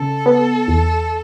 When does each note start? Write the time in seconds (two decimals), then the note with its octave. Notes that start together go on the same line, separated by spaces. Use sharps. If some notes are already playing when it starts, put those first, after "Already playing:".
Already playing: C#3 A4
0.26 B3
0.68 E2